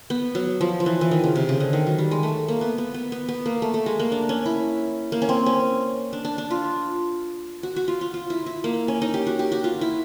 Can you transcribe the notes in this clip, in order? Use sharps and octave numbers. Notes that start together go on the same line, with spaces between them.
B3
F#3
F3
F3
E3
E3
D#3
C#3
C3
C#3
D3
D#3
F#3
G3
G#3
A3
A#3
B3
B3
B3
B3
B3
A#3
A3
A3
G#3
A#3
D4
C#4
E4
A#3
C#4
C4
C#4
D4
D4
D4
F4
F#4
F#4
F4
F4
F4
E4
E4
A#3
C#4
D#4
G4
F#4
G4
F#4
F4
E4